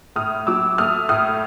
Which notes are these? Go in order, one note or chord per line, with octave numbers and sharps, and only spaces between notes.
A2 D#6 F6
F#3 D6 E6
A3 D#6 F6
A2 D#6 F6